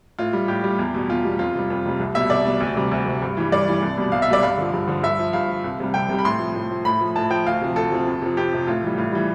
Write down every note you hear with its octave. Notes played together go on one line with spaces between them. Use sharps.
A2 F4
G3
A2 G4
G3
E2
B2 G3
E2 F4
B2 G3
F2 F4
C3 G3
F2
C3 G3
C2
B2 G3 E5
C2 D5
B2 G3
D2
C3 G3
D2
C3 G3
G2
E3 G3
G2 D5
E3 G3
C2
B2 G3
C2 F5
E5
B2 G3 D5
G2 F5
D3 F3
G2
D3 F3
G2 E5
F3
G2 F5
F3
C2
C3 G3
C2 G5
C3 G3
B5
A2 C6
F3
A2
F3
A2 B5
F3
A2 A5
F3 G5
D2 F5
C3 F3
D2 A4
C3 F3
F2
C3 F3
F2 G4
C3 F3
A2 F4
E3 G3
A2 F4
E3 G3